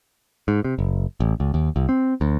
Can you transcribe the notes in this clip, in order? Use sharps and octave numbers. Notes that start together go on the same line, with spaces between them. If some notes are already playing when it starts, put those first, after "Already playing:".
G#2
C3
F#1
A1
C#2
D#2
C2
C4
D2